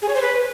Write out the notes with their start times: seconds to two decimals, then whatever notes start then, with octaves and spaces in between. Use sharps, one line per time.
0.02 G#4
0.08 C#5
0.15 C5
0.21 B4